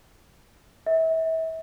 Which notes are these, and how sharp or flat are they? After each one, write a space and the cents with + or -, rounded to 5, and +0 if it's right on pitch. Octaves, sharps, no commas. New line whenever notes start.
E5 -30